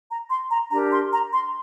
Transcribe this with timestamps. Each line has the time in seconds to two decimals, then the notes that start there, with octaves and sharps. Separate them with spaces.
0.10 A#5
0.30 C6
0.51 A#5
0.71 D4 G4 A#4 A#5
0.92 C6
1.12 A#5
1.32 C6